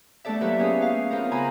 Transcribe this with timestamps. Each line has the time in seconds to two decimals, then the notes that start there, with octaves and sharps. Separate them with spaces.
0.25 A3 B3 D4 A4 D5 E5
0.41 F#3 A#3 E4 G4 B4 E5
0.58 A3 B3 C#4 G#4 C#5
0.82 F5
1.10 B3 C4 D#4 F4 A#4
1.31 C#3 E4 F4 G#5 A#5 B5